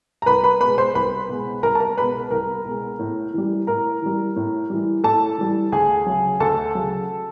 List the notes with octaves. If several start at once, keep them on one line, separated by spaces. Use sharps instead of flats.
A#5
C2 B4 B5
B4 B5
B2 G#3 B4 B5
C5 C6
C2 B4 B5
B2 G#3
C2 A#4 A#5
A5
A#4 A#5
B2 G#3 B4 B5
C2 A#4 A#5
B2 G#3
A2
E3 G3
A2 A#4 A#5
E3 G3
A2
E3 G3
A2 A4 A5
E3 G3
D2 G#4 G#5
C#3 F#3
D2 A4 A5
C#3 F#3